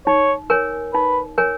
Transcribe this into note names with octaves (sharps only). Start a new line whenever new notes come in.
D#4 C#5
A#4 C#5 G#5
D#4 B4
A#4 C#5 G#5